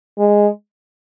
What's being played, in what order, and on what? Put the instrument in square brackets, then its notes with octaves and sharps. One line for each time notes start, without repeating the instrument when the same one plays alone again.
[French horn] G#3